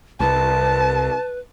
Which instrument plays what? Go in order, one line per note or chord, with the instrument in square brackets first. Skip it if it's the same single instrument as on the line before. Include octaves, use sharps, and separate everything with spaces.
[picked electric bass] C2 [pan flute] B4 [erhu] A5